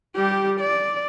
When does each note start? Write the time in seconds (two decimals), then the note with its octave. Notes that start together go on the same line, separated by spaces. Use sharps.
0.16 G3 G4
0.61 D5